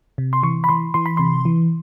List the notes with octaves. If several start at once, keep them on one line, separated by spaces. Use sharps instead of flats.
C3
C6
E3 C#6
B5
E3 C6
E3 C6
B5
C3 C6
E3